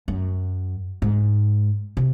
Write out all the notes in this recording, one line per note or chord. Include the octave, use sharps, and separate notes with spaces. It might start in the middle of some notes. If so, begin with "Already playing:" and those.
F#2
G#2
C3